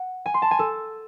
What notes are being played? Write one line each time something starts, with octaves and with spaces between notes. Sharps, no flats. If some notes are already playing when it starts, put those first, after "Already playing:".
Already playing: F#5
G#5
C6
A5
G#5
A4